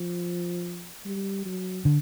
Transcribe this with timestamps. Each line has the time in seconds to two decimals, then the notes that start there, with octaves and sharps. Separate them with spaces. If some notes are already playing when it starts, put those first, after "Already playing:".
Already playing: F3
1.05 G3
1.45 F#3
1.85 D3